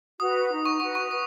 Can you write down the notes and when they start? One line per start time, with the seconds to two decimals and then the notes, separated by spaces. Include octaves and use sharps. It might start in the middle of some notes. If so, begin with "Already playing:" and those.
0.20 F#4 B4 F#5 D#6
0.51 D#4
0.65 C#6
0.80 F#4 B4 F#5 C#6
0.95 C#6
1.11 B4 D#6